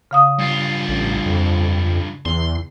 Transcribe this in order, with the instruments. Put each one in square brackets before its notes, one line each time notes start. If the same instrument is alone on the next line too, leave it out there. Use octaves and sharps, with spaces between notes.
[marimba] C#3 F5 D#6
[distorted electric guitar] G2 F4
[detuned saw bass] A1
F2
[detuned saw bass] E2 [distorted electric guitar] C6